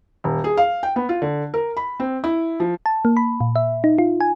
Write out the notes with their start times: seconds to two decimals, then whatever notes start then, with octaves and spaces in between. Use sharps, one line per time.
0.24 D#1
0.44 G#4
0.57 F5
0.83 G5
0.96 B3
1.09 F4
1.22 D3
1.54 A#4
1.77 B5
2.00 C4
2.24 E4
2.60 F3
2.86 A5
3.05 A#3
3.17 B5
3.41 A#2
3.56 E5
3.84 D#4
3.98 F4
4.21 G#5